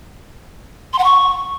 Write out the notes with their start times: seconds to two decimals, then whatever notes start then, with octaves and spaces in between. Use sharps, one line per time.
0.93 C6
0.99 F#5
1.04 C#6